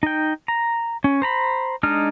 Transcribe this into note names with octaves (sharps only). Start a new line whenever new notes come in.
D#4 G5
A#5
C#4
C5 A#5 B5
G#3 D4 D#4 F6